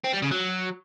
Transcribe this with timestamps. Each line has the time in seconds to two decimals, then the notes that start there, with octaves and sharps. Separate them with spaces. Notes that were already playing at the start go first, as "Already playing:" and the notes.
0.04 C4
0.13 G3
0.22 C#3
0.31 F#3